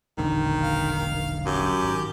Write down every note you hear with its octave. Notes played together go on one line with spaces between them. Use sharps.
E1 A#1 D3 D#3
F5
F#2 G4
G#1